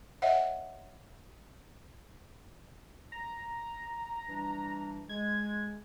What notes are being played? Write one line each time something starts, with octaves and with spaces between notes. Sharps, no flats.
C#5 D#5 E5 F#5
A#5
E3 G3 D4
G#3 G#6